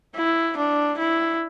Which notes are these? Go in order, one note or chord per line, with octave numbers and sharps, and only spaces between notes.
E4
D4
E4